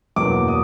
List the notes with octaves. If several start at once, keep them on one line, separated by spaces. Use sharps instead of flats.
E2 B2 F#3 A#3 D6
D#6